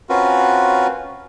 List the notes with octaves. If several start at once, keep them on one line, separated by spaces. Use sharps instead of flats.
C4 C#4 F4 F#4 A#4 B4